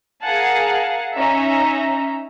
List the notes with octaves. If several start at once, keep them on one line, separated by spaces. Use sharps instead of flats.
G#4 A#4 F5 F#5 G#5 A5
C#4 D#4 E5 A#5